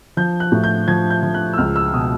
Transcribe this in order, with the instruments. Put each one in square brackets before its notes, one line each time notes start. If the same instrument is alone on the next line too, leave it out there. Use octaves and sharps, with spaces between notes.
[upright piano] F3 G6
F#6
A2
G6
F3 G#6
G6
F3
F#6
E6
C#2 F6
E6
B2 D#6